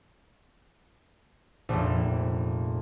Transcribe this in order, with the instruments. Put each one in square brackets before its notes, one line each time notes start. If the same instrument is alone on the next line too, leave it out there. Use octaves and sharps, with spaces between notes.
[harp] F1 A#1